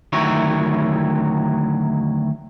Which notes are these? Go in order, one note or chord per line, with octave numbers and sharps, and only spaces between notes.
D2 D#3 F#3 E4 C#5